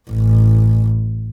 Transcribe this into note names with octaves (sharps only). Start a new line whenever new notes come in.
A1